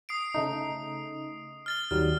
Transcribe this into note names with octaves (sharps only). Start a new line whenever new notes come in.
D#6 C7 D7
C#3 A3 D#4
F6 A6 G7
D#2 F#3 G3 F6